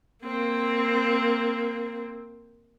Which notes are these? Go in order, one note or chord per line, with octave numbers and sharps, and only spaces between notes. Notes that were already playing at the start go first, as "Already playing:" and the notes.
A#3 C4